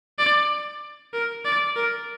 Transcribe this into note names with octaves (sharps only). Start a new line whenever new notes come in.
D5
A#4
D5
A#4